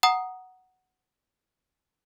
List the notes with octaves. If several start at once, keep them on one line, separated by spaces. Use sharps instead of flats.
F#5 A#5 D#6